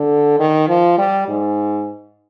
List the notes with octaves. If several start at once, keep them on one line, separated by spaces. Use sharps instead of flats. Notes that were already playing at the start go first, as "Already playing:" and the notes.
Already playing: D3
D#3
F3
G3
G#2